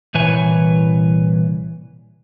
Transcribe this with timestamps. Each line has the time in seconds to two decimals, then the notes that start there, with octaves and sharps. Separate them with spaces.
0.14 C2 A#2 E3 B4 C#5 G#5